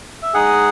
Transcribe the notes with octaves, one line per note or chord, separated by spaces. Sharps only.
E5
G#3 D#4 G#4 F#5